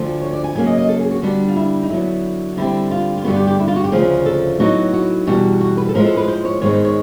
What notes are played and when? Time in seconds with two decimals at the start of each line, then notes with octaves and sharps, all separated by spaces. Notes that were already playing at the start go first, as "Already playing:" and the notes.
Already playing: D2 D3 F3
0.21 C#5
0.33 D5
0.44 G#5
0.55 C#3 F#3 A#3 C#4 G#5
0.67 D#5
0.78 D#5
0.89 A4
1.01 G#4
1.11 F#4
1.22 D3 G3 B3 D4 F#4
1.48 F4
1.56 E4
1.83 D#4
1.90 D3 F#3 B3 E4
2.57 D3 G3 C4 E4
2.91 F4
3.18 F4
3.24 G2 D3 G3 B3 F#4
3.36 G4
3.47 G4
3.60 E4
3.68 F4
3.76 F#4
3.84 G4
3.92 D2 C#3 F3 G#4
4.26 A4
4.59 A2 F#3 B3 D#4 F#4
4.93 F#4
5.27 E2 B2 G3 F#4
5.61 F#4
5.77 B4
5.89 A4
5.94 A2 F3 G#3 A#4
6.06 A4
6.17 B4
6.28 C5
6.45 C#5
6.62 G#2 D#3 G#3 B3 C#5
6.73 C5
6.85 C#5